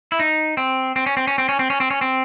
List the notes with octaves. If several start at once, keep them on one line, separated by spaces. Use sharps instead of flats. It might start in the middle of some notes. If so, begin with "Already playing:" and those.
E4
D#4
C4
C4
C#4
C4
C#4
C4
C#4
C4
C#4
C4
C#4
C4